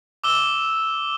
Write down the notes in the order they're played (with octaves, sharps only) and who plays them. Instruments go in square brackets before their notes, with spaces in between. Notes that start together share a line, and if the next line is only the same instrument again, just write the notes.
[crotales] D6 E6 E7 G7